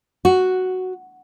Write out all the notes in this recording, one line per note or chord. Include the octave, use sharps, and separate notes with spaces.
F#4